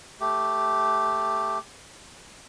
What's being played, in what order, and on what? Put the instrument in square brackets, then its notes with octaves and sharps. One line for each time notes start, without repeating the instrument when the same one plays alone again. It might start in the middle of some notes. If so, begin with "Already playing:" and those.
[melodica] A3 G4